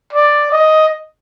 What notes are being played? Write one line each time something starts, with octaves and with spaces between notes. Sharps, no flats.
D5
D#5